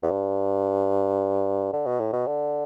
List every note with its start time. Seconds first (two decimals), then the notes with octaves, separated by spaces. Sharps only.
0.03 E2
0.11 G2
1.73 D3
1.86 B2
2.00 A2
2.13 B2
2.27 D3